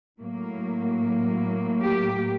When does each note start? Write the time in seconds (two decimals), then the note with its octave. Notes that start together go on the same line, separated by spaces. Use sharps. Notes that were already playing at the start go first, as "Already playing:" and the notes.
0.21 A2 F#3 A#3
1.81 G4